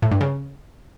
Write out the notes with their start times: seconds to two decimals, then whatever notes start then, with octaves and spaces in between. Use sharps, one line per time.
0.02 A2
0.12 G2
0.21 C#3